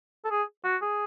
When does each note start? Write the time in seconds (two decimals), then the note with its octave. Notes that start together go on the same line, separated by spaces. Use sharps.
0.25 A4
0.31 G#4
0.65 F#4
0.82 G#4